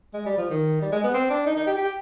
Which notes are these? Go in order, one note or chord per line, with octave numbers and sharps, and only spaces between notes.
G#3
G3
F3
D#3
G3
G#3
B3
C4
D4
D#4
D#4
G4
G4